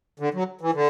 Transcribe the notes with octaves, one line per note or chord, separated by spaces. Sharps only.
D3
F#3
E3
D3